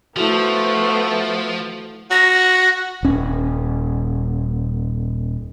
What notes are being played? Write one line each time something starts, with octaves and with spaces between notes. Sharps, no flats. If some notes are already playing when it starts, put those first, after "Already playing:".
F3 A3 B3 E4 F#4 C5
F#4 A#6
D#1 C#4